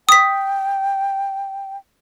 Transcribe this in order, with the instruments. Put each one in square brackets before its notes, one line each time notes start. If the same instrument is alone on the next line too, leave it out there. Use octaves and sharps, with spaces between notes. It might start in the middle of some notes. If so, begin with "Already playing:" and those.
[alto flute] G5 [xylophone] D#6 B6